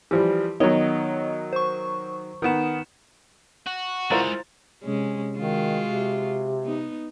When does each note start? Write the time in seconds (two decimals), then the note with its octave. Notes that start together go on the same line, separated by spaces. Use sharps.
0.11 E3 F3 G3 G4
0.60 D#3 F#3 B3 C#5 D#5
1.53 C5 C#6
2.42 D#3 B3 D#4 E7
3.67 F#4
4.11 G#3 E4 F4 A#4 C5 F5 A#5 A6
4.84 C3 G#3 C#4
5.38 D#3 G#3 F4 F#4
5.88 C3
6.63 B3 D#4